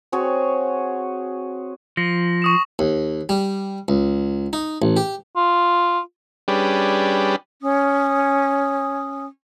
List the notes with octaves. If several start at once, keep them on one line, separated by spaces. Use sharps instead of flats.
C4 F#4 G#4 C#5
F3 A#6
C#6 D#6 E7
D#2
G3
C#2
D#4
A1
G4
F4
G3 C#4 D4 G4 G#4 B4
C#4 D#6